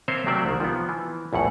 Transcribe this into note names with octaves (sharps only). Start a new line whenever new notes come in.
A#3 C4 C5 C#5 E5
C3 F#3 A3 A#3 D5 E5
C2 D#3
F3 B3
E3
A#1 E2 A2 F#5